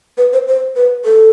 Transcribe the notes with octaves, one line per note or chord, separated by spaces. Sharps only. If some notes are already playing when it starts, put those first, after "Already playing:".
B4
C5
C5
B4
A4